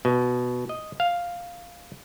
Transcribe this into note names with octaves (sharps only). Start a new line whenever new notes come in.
B2
D#5
F5